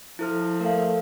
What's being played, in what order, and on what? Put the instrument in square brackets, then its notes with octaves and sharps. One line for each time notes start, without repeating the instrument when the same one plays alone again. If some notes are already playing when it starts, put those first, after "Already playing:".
[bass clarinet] F3 [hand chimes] E4 A4 F6
[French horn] A3 [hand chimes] A#4 F5